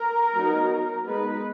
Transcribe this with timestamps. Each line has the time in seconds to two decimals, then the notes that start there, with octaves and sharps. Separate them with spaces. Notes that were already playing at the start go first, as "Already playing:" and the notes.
Already playing: A#4
0.34 F#3 B3 D#4
1.05 G#3 B3 D#4 B4